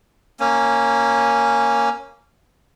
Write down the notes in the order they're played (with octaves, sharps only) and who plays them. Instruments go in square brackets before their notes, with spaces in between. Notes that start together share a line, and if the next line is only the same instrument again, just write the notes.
[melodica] A#3 C#4